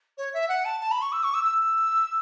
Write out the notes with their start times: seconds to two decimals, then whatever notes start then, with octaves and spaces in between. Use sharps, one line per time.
0.18 C#5
0.34 E5
0.49 F#5
0.65 A5
0.80 A5
0.91 B5
1.02 C#6
1.12 E6
1.24 C#6
1.34 E6
1.44 E6